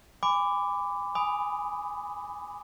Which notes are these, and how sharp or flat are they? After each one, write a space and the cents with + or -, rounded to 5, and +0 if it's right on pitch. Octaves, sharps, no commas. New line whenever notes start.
G#5 -30 B5 +25 D6 +0
G#5 +0 B5 +10 D#6 +0